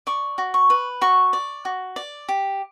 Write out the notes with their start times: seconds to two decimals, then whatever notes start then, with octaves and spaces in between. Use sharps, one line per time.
0.07 D5 C#6
0.38 F#4
0.54 C#6
0.70 B4
1.02 F#4 C#6
1.33 D5
1.65 F#4
1.96 D5
2.29 G4